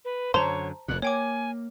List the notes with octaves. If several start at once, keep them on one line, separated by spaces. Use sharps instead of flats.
B4
F#2 D3 C5 C#5 A5 A#5
F1 F2 A#2 F#6
A#3 C#5 G5 G#5 D6